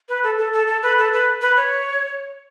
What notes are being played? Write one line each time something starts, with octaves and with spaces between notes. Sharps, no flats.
B4
A4
A4
A4
A4
B4
A4
B4
B4
C#5